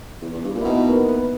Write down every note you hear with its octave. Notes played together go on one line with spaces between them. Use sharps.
E2
E2
G2
A#2
E4
B2 D#4
B3
A#3
B3